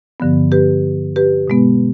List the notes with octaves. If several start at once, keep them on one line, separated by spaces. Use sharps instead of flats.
G2 D3 F3 B3
G4 B4
G4 B4
B2 G#3 B3